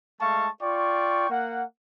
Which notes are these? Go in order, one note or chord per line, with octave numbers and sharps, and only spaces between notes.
G#3 A3 F5 A5 C#6
F4 D5 G5 C#6
A#3 F#5